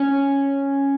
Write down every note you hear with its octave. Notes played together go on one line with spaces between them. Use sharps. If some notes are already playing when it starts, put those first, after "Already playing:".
Already playing: C#4